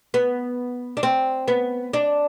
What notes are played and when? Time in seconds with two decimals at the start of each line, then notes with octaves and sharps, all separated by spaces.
0.14 B3
0.97 D4
1.03 C4
1.48 B3
1.93 D4